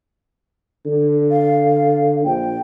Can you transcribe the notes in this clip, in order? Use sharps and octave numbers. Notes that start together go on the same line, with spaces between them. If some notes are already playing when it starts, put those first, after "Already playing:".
D3
F5
A#1 G5